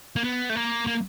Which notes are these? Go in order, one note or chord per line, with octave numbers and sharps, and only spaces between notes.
A#3
B3
A3
A#3
A#3